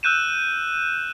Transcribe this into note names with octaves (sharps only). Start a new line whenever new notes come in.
E6 F#6 G6 D#7 E7